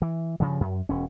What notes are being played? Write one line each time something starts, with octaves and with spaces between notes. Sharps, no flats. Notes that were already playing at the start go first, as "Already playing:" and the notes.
E3
G2 C#3 F3
F#2
E1 C#4